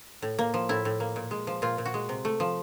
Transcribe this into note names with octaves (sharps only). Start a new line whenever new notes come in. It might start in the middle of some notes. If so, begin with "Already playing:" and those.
A2
A#3
F3
A2 E4
A2
A#3
A#2
G#3
F3
A#2 F4
A#2
F#4
G#3
C3
A3
F3